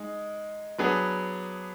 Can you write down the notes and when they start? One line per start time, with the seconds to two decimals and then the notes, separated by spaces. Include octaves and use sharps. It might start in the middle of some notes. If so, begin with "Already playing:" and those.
Already playing: G#3 D#4
0.78 F#3 B3 D4 G#4